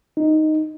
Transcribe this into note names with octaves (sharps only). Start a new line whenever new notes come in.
D#4